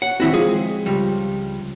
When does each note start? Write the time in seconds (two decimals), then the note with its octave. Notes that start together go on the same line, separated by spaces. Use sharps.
0.02 C#5 F#5
0.20 D#3 C4 E4 F#4
0.34 F3 G#3 F4 G#4
0.86 C#2 G3